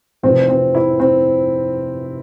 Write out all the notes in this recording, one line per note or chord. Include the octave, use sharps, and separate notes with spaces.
F1 F2 C3 E3 C4
C4
E4
C4